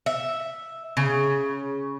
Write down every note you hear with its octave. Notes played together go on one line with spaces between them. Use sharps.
E5
C#3